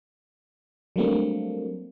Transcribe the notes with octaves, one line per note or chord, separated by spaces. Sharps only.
F#3 G3 A3 A#3 C4 D4